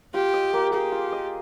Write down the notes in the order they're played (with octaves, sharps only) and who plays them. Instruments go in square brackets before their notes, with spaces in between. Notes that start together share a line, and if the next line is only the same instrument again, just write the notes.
[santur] F4 [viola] G4
[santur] D#5
A#3
[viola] G4 [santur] G#4
[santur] F4
D#5